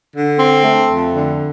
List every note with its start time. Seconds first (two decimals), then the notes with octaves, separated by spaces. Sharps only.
0.15 D3
0.39 C4
0.64 A3
0.89 F2
1.14 D3